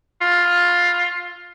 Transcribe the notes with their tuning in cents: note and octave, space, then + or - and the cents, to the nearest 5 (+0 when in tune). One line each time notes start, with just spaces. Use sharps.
F4 +10